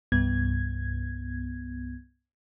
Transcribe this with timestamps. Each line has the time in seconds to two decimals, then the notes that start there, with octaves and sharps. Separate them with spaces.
0.12 C2 G2 B3 G#6